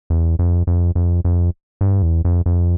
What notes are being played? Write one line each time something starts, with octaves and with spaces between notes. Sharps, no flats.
E2
F2
F2
F2
F2
G2
E2
F2
F2